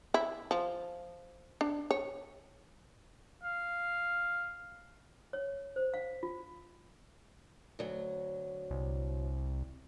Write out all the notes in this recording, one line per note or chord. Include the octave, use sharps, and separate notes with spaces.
E4
F3
D4
C#5
F5
C#5
C5
F5
F4
D2 F#3
C2